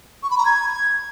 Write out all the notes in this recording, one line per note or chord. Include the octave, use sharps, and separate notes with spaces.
C#6
B5
A#5
G#6